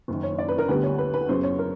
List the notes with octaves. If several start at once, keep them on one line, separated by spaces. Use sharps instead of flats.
F#1 F#2 D#3
C#5
D5
B4
A#4
D2 D3 G3 B3 B4
C#5
B4
B4
F#2 C#3 F#3 B3 C5
C#5
A#4